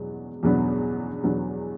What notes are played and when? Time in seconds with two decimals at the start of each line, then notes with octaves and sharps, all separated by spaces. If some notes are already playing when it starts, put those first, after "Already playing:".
Already playing: E2 B2 F#3 B3
0.43 E2 B2 F#3 B3 D4
1.23 E2 B2 F#3 B3 D4